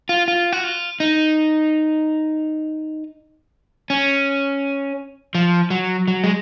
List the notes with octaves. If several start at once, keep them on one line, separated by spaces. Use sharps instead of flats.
F4
F4
F#4
F4
D#4
C#4
F3
F#3
F#3
G#3